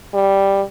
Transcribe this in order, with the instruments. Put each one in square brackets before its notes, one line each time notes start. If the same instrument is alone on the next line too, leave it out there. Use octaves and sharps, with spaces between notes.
[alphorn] G3